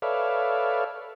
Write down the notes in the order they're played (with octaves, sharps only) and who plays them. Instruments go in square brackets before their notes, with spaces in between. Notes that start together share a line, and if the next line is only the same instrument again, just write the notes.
[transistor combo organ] A4 B4 C#5 D5 E5 F5